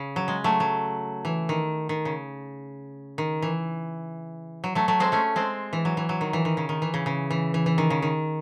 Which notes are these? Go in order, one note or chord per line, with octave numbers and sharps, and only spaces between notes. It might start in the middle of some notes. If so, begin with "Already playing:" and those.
Already playing: C#3
F#3
G#3
F#3 A3
F#3
E3
D#3
D#3
C#3
D#3
E3
F#3
F#3 A3
F#3 A3
G#3 C4
A3 C#4
G#3 C4
E3
F#3
E3
F#3
D#3
E3
D#3
C#3
D#3
E3
C#3
C#3
E3
E3
E3
D#3
C#3
D#3